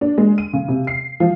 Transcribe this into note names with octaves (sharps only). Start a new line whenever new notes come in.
D4
G#3
D#7
C#3
C3
C7
F3